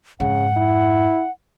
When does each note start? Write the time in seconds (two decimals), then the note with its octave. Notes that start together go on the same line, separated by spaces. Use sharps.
0.20 F2 G#2 C#3 F#5
0.57 E4